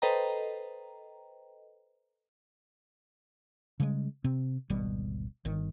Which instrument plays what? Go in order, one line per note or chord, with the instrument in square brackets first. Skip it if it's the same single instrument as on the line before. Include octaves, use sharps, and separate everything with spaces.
[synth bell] A4 B4 C5 D#5 G5 A#5
[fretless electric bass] C#3 G3 G#3
C3 C4
D1 G#1 B2 G3
G1 D#3